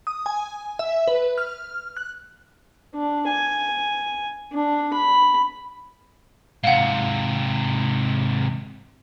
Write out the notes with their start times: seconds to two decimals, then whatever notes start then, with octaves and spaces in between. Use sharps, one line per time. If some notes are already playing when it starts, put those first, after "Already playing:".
0.07 D#6
0.26 G#5
0.79 E5
1.08 B4
1.38 F6
1.97 F#6
2.95 D4
3.28 G#5
4.53 D4
4.93 B5
6.64 G#2 C3 F5 F#5